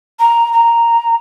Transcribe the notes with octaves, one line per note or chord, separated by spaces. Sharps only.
A#5
A#5